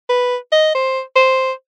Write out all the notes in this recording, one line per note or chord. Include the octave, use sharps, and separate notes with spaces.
B4
D#5
C5
C5